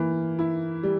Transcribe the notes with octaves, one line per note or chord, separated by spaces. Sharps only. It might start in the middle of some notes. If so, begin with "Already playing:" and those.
Already playing: E3 A#3
E4
G3